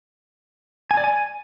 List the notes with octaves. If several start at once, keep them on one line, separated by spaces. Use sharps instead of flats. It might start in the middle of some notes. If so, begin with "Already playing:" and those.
G#5
D5
G#5